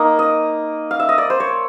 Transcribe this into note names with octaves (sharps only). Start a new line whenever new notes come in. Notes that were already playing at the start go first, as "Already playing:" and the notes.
Already playing: A#3 D#4
D#5
F5
E5
D#5
D5
C5
C#5